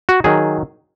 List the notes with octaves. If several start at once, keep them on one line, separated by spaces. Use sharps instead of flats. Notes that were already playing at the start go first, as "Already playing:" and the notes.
F#4
D#3 F#3 G#4